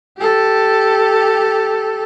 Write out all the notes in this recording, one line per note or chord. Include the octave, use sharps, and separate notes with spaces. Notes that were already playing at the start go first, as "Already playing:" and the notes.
G4 A4